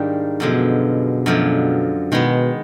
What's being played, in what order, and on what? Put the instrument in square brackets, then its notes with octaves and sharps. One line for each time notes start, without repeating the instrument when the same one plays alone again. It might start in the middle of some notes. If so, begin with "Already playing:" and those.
Already playing: [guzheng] G#2 D#3 G3 A#3 D4
[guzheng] F#2 D3 F3 G#3 [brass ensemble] B2
[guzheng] F#2 D3 F3 G#3
[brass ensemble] B2 [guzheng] D#3 G#3 B3